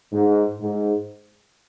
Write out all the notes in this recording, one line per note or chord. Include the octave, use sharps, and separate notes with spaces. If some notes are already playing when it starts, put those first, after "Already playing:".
G#2
G#2